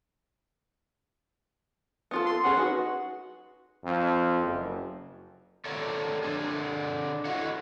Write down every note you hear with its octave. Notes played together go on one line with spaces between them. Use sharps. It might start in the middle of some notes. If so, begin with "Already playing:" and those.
B3 F4 A4
C6
C#4 F4 G#4 F#5
D#4 F#4 B4
F2
F#1
A4 A#4 C#5 D5 E5
D3 D4 G#4
E4 F#4 A4 C#5 D#5 F#5